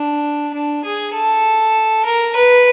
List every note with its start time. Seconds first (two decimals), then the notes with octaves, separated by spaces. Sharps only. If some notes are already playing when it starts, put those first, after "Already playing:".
Already playing: D4
0.54 D4
0.85 G#4
1.14 A4
2.05 A#4
2.36 B4